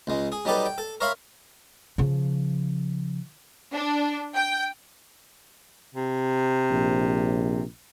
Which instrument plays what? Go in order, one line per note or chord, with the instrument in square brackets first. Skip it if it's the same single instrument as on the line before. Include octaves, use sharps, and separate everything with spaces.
[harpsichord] C#2 G#3
G#4
F#3 G3 D#4 G4 A4 B4
G5
A4
A#4 C#5 E5 F5 B5 C6
[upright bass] C#3 F3
[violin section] D4
G5
[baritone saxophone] C3
[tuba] A#1